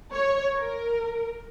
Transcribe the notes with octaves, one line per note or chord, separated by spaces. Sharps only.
C#5
A#4